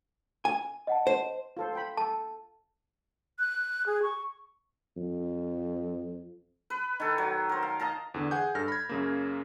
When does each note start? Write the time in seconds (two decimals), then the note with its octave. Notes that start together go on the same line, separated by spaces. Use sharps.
0.45 G#5
0.87 D#5 F#5 A5
1.07 C5
1.57 F4 A4 C5
1.73 C5 G5 B5
1.97 A4 A5
3.39 F#6
3.86 G#4
4.03 C#6
4.97 F2
6.70 B4
7.00 D#3 A4
7.18 F#3
7.49 A#4 C5
7.63 F5
7.80 D#5 F5 A5 A#5
8.14 E2 D3
8.31 G#4 F#5 G#5 G6
8.55 G2 A4 F6 A#6
8.68 B5 G#6
8.89 F#2 C#3 A#3